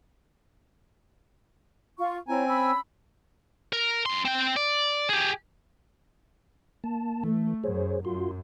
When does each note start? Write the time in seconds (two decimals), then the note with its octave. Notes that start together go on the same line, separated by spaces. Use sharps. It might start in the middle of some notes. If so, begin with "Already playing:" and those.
1.98 F4 C#6
2.28 C4 E4 C#5 G#5 A#5
2.46 C#4 B5 E6
3.73 A#4
4.06 F#2 C6
4.25 C4 G5
4.56 D5
5.09 G4 G#4
6.84 A#3 A5
7.24 E3 A3
7.64 F#2 G#4 C5 C#5
8.05 F#2 F4 F#4 C6